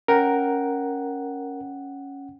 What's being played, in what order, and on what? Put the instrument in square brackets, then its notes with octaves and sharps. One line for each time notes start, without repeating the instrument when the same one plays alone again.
[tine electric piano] C#4 F#5 G5 [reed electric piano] A#4